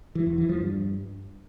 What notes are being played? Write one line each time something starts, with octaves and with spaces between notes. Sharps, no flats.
E3
E2
E3
F3
G2